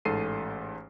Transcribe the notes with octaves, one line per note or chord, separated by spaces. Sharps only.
A1 G#2 A4 C7 D#7